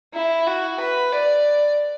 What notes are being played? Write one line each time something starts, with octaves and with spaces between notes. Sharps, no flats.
E4
F#4
B4
D5